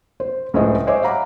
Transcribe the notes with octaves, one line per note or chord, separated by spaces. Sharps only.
C5
C#2 A2 G#3 C5 D#5
C5 C#5 D#5 E5 G#5 D6
F5 F#5 A#5 B5 D6